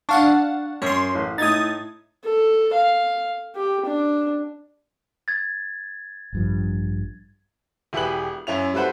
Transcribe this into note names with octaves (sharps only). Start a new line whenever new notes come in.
D4 F5 F#5 A5 C#6
F#2 C#5 C6
A1
A2 D#4 D#6 G#6 A6
A4
F5
G4
D4
G#6 A6
A1 G2 F3
E1 E4 G4 G#4 B4 F#7
F#2 C#4 E4 F7
G3 E4 A4 B4 C5 F#5